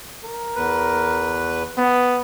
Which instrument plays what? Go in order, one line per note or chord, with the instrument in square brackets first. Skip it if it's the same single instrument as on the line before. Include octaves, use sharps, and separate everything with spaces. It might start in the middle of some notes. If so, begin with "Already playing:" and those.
[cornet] A#4
[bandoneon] E2 B4
[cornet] B3